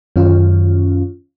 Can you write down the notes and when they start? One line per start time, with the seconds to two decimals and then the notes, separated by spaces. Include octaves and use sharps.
0.16 F#2 D#3 C#4 F4